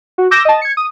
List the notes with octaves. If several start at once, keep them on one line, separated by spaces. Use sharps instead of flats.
F#4
D6 E6 G6 A#6 E7
D#5 A5
G#6 C#7
D#6